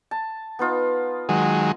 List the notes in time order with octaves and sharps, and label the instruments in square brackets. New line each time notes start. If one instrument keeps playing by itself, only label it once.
[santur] A5
B3 D#4 F4
[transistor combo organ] D#3 F#3 G#3